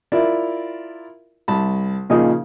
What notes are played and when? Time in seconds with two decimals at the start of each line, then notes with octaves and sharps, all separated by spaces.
0.12 E4 F4 A#4 D5 E5
1.48 C2 A5 B5
2.10 A#2 C#3 F3 A#3 D#4 G#4